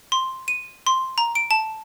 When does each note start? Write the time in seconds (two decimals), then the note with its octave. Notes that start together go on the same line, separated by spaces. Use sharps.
0.12 C6
0.48 D#7
0.87 C6
1.18 A#5
1.35 D7
1.51 A5